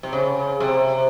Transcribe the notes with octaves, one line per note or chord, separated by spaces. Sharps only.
C3
C#3
C3